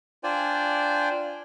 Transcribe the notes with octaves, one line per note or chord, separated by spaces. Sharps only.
D4 F4 C5 D5 G5 G#5